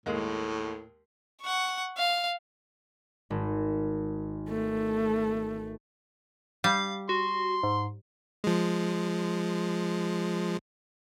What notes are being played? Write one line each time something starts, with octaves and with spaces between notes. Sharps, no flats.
D#2 A2 G#3 A#3
F#5 C#6
F5
G#1
A3
G3 F5
F#4 C6
G#2
F3 G#3